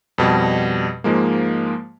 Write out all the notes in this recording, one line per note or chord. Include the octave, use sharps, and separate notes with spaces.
F2 B2 G3 A5
G#2 F3 G#3 A#3